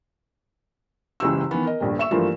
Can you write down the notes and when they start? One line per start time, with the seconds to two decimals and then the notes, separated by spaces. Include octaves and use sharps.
1.20 F#1 C#2 E3 G4 E6
1.51 D#3 E3 B3
1.65 A#4 D#5
1.80 D#1 A#1 G2
1.99 E5 C#6 E6 E7
2.11 G2 E3 F3 A3 A#3 F4